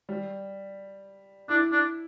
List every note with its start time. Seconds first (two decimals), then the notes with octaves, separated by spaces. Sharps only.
0.09 G3
1.49 D4 E4
1.72 D4